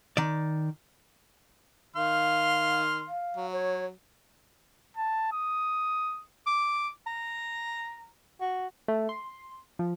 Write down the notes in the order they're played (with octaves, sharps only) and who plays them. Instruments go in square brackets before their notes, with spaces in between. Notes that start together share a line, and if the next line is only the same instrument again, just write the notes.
[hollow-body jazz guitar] D#3 D5
[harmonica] D#3 C6 F6 [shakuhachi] F5
[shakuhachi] F5
[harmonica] F#3
[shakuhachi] C#5
[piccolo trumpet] A5
D#6
[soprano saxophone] D6
A#5
F#4
[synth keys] A3
C6
F3